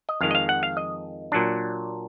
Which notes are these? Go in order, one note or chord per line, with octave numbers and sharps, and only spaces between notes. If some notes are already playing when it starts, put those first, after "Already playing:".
D#5
F2 D#3 G#3 F5
D#5
F5
F#5
F5
D#5
A#2 F#3 D4